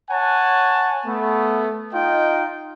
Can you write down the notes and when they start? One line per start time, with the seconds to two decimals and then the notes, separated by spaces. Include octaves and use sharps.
0.11 C#5 F#5 G#5 A5
1.07 A3 B3
1.94 D#4 F4 D#5 G5